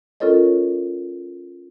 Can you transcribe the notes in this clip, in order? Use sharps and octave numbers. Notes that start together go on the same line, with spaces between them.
C#4 F4 A4 A#4 C#5 D#5